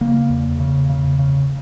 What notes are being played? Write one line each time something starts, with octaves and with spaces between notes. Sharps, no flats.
C#3 A#3
E2
C#3
C#3
C#3